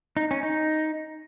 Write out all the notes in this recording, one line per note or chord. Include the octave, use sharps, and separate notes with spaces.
D#4
C#4
D#4